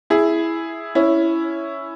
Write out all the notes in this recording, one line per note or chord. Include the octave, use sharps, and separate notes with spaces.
E4 G#4
C#4 E4